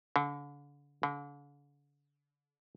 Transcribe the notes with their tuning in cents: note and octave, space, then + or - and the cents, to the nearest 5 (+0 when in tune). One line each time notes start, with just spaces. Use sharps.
D3 -35
D3 -40